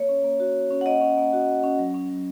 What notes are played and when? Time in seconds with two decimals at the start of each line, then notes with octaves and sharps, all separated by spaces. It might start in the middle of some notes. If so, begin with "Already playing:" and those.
Already playing: A#3 C#5
0.09 C#4
0.24 A#3
0.40 F#4
0.55 A#3
0.70 C#4
0.81 F#5
0.86 A#3 D#5
1.01 C#4
1.17 A#3
1.33 F#4
1.48 A#3
1.63 C#4
1.79 F#3
1.94 C#4
2.10 F#3